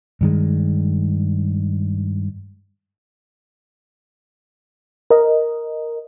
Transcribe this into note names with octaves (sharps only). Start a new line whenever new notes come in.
G2 D#3 G#3
A#4 D#5